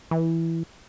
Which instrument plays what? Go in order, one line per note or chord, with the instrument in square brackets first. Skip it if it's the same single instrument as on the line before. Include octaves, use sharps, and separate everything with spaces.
[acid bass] E3